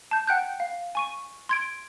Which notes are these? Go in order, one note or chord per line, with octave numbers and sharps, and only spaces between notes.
A5 G6
F#5 G5 F#6 G6
F5
G#5 C#6 D#7
C6 G#6 D7